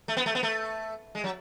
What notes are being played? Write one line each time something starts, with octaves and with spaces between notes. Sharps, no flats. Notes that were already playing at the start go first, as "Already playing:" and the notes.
A3
B3
A3
B3
A3
G#3
F#3